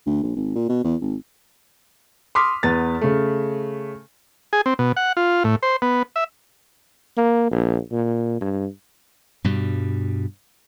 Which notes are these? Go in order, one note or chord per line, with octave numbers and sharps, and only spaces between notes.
D2
A#1
G#1
A#2
B2
E2
G#1
C6 D6 D#6 F6 B6
E2 B3 A6
C#3 A3
G#4
C4
B2
F#5
F4
A2
C5
B3
E5
A#3
A#1
A#2
G2
G2 B2 G3